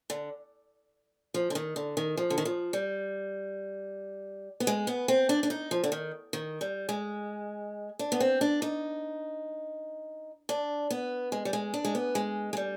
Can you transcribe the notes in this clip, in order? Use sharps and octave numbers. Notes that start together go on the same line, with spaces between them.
D3
F3
D3
D#3
D3
D#3
F3
D3
D#3
F3
G3
B3
G#3
B3
C4
D4
D4
D#4
F3
D3
D#3
D#3
G3
G#3
D4
B3
C4
D4
D#4
D4
B3
G#3
G3
G#3
D4
G#3
B3
G#3
G#3
G3